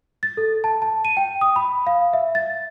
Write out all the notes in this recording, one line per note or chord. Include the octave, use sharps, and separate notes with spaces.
A6
A4
A5
A5
D#7
G5
D#6
B5
F5
E5
A6